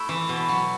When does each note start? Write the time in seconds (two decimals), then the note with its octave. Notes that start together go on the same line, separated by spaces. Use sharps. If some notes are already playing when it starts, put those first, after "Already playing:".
Already playing: A3 E4
0.09 E3
0.29 B2
0.49 F#3